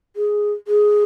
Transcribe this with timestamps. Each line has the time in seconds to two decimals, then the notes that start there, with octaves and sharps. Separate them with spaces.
0.16 G#4
0.68 G#4